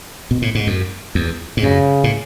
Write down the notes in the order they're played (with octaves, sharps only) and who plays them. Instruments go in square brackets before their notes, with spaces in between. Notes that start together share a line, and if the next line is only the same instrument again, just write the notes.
[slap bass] B2
A2
G#2
F#2
E2
G#2
[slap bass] F#2 [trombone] C#3
[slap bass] A2